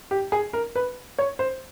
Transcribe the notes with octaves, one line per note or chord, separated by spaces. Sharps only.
G4
G#4
A#4
B4
C#5
C5